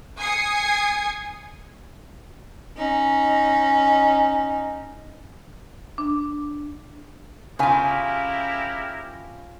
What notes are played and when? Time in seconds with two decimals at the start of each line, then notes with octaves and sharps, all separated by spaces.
0.20 G#5 D#6 G#6 C7 C#7
2.77 C#4 D#4
5.98 D4
7.59 C#3 C#4 E4 F4 G4 A#4 G#5